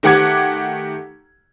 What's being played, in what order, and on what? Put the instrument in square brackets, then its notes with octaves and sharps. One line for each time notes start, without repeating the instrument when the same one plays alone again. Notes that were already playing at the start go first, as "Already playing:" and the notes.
[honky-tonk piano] D#3 A3 G4 F#5 D6 G#6